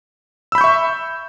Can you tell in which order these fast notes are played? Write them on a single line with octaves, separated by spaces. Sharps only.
E6 B5 G6 C#6 E5